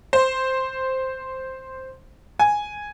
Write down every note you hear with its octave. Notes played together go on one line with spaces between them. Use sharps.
C5
G#5